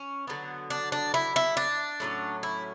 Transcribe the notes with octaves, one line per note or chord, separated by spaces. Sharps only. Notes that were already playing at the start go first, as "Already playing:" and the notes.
Already playing: C#4
D3 F#3 B3
D4
D4
E4
E4
D4
A2 F#3 A3 C#4
E4